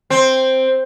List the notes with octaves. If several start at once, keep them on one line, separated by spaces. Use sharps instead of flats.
C4